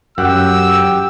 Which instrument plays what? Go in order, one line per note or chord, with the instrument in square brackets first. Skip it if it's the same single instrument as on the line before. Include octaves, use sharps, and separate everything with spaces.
[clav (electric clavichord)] F#2 [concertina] G4 G5 [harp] F#5 [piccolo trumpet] E6